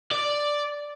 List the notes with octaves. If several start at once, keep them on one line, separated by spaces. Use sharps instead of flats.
D5